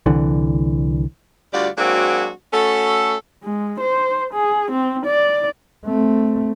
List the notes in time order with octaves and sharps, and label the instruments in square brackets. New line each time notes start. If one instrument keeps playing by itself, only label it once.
[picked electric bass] C2 D3 E3
[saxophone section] D2 G3 F4 F#4 D5
F#3 G#3 A#3 C4 D4 F#4
A3 C#4 F#4 A4
[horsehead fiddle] G#3
C5
G#4
C4
D5
[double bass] A3 C4